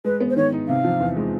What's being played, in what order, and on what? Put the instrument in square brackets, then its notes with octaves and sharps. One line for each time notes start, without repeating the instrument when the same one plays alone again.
[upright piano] G#3 [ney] B4
[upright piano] B3
[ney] C5
[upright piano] D#3 [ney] C#5
[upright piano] D#4
[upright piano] C3 [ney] F5
[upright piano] F3
E2
G#3